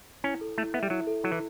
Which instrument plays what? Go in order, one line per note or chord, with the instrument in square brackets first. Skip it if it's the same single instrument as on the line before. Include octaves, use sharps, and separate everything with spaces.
[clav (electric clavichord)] C#4 [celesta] E4
[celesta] A4
[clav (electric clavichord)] A3 [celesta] E4
[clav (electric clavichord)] B3 [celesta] E5
[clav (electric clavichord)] G3
[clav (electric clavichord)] F#3 [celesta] E4
[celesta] A4
[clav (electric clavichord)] F#3 [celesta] E4
[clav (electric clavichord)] E3